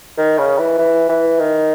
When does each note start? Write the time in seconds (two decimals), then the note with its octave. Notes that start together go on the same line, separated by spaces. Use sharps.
0.18 D#3
0.38 C#3
0.59 E3
0.78 E3
1.09 E3
1.39 D#3